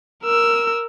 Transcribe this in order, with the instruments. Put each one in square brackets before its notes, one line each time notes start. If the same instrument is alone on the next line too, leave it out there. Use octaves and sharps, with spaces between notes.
[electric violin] A#4 E6